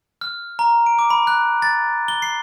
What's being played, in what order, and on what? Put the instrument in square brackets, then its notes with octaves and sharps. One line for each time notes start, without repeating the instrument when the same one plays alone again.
[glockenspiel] F6
A#5
D7
D6
B5
F#6
A6
G7
C7